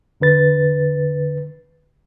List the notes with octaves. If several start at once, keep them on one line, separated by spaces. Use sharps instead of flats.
E2 D3 B4 A6